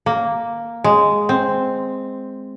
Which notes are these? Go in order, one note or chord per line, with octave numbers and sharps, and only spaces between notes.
A#3
G#3
C4